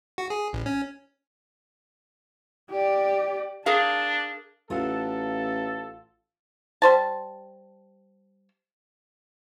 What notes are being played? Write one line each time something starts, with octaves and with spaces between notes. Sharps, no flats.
F#4
G#4
A1
C#4
G4 D5
D4 G#4 A#4 F5 A5
A1 F4 A4 F5 F#5
G3 C5 A5